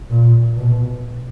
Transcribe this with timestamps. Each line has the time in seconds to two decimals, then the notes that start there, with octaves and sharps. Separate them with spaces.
0.10 A#2
0.57 B2